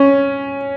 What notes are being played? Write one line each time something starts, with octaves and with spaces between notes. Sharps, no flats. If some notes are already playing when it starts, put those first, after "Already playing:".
Already playing: C#4